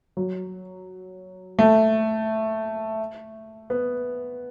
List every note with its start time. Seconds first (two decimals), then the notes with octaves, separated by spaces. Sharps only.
0.17 F#3
1.59 A3
3.70 B3